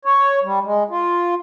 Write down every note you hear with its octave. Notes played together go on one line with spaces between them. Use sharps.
C#5
G3
G#3
F4